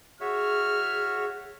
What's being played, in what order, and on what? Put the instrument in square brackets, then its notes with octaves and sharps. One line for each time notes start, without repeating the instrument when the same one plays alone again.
[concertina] F#4 C#5 E5 [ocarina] G#4 [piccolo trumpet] F6